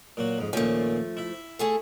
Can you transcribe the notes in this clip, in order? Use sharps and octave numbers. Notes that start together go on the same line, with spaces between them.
A#2 F#3 F#4
F2 G#2
D#2 A#2 F3 A3 C#4
E4 E5
A3 G#4 A4